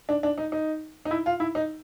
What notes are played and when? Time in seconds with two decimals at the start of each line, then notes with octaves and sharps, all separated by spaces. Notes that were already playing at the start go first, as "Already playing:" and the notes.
0.09 D4
0.23 D4
0.38 D#4
0.52 D#4
1.05 D#4
1.11 E4
1.26 F4
1.40 E4
1.55 D#4